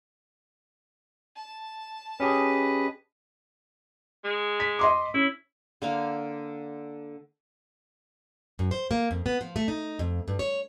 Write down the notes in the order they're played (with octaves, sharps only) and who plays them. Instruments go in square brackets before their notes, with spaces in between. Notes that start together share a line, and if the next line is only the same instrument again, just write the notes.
[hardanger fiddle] A5
[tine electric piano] C#4 G4 G#4 [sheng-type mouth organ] B4 D#5
[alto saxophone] G#3
[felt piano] B6
D#5 C6 D6
[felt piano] C#4 [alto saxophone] E4
[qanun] D3 A#3 F5
[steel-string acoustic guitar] F#2
C5
A#3
F2
B3
F3
A3
D#4
F2
G2
C#5